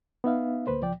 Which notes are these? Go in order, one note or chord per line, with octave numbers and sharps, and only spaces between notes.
B3 D#4 E5 F5
D2 A#3 B4 C5
C#2 F3 D5 G5